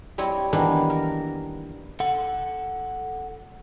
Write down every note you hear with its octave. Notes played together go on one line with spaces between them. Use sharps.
G3 C4 E4 C#5 D#5
D#3 E3 A#3 B3 D4 E4
A#4
A4 F#5